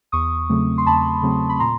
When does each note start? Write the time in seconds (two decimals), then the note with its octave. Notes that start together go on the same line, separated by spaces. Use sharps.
0.12 E2 C#6 D#6
0.49 C#3 F#3 A3 C4
0.78 C6
0.86 E2 A5 B5
1.22 C#3 F#3 A3 C4
1.49 B5
1.60 A#2 A#5 C6